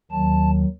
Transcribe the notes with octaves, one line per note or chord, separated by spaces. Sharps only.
D#2 D#3 F#3 A5